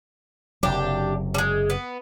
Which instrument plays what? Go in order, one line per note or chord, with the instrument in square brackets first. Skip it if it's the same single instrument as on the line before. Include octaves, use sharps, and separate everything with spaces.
[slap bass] F#1 C3 F#3 [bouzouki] D4 G4
[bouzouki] G3 G#3
B3